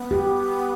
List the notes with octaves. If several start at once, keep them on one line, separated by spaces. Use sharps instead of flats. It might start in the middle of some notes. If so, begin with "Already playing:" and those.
Already playing: B3
G4